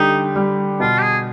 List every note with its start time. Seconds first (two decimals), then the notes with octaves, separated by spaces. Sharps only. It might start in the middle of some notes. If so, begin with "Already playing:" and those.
Already playing: D3 G3 D#4 G4
0.36 G3
0.80 B2 F4
0.98 G4
1.02 G#4